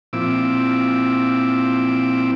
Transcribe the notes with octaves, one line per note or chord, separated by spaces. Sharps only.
A#2 F3 C4 E4 D6 E6